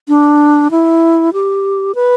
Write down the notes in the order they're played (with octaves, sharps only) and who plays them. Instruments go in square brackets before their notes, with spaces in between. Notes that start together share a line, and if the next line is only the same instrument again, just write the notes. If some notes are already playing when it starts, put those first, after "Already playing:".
[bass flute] D4
E4
G4
B4